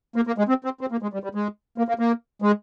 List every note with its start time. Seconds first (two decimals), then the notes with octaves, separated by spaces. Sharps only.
0.16 A#3
0.27 A#3
0.38 G#3
0.49 C4
0.64 C4
0.81 C4
0.92 A#3
1.02 G#3
1.13 G3
1.24 G3
1.35 G#3
1.78 A#3
1.88 A#3
1.99 A#3
2.42 G#3